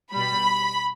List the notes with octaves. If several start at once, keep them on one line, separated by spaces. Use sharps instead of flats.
B2 G3 B5